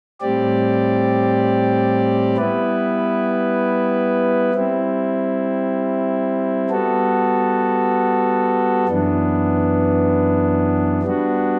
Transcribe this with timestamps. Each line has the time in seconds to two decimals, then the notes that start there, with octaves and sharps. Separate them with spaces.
0.20 A2 G3 C4 G4 D5
2.37 G3 B3 E4 B4
4.54 G3 C4 E4
6.70 G3 B3 F#4 A4
8.86 F#2 E3 B3 D4
11.02 G3 B3 D4 F#4